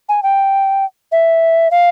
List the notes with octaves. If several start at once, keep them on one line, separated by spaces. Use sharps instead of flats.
G#5
G5
E5
F5